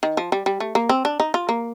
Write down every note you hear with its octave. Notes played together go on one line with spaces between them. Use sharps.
D#3
F3
G3
G3
A3
A#3
C4
D4
D#4
F4
A#3